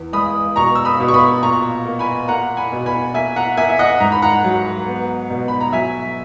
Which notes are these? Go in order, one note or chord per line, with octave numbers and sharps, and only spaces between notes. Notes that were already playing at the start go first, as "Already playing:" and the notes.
Already playing: E2
G#3 B5 D#6
B2 A#5 C#6
E6
B5 D#6
B2
C#6
B5 D#6
A#2 A#5 C#6
A#3
G#5 B5
A#3 F#5 A#5
G#5 B5
B2
G#5 B5
A#3 E5 G#5
F#5 A#5
A#3 E5 G#5
E5
D#5 F#5
G#2 A#5
B5
F#5 A#5
F#3
B3
B2
B5
A#5
F#3 E5 G#5